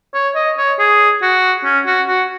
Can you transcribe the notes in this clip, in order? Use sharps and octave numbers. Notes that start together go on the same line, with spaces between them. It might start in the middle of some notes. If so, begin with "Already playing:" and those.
C#5
D#5
C#5
G#4
F#4
C#4
F#4
F#4